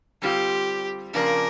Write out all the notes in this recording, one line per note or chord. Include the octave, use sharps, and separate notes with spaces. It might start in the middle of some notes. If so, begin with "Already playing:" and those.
D3 G3 C4 F4 G4
F2 C#3 F3 A#3 D4 A#4